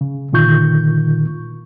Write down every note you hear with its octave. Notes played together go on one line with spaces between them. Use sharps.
C#3
A#2 D3 D#3 F4 C#6 G6